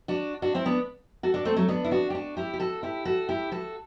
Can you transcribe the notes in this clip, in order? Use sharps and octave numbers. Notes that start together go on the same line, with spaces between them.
D4 F#4
D4 F#4
C4 E4
B3 D4
F#4 A4
D4 F#4
A3 C4
F#3 A3
B3 D4
E4
D4 F#4
G4
D4 F#4
E4 G4
G4
F#4 A4
E4 G4
F#4 A4
E4 G4
F#4 A4